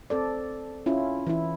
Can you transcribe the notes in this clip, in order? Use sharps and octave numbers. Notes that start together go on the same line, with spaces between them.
C4 A4 D5
C#4 E4 F4
E3 E4